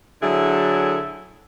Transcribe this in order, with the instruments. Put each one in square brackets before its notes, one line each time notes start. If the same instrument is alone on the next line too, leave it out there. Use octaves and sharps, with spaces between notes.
[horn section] D3 F#3 E4 G#4 A4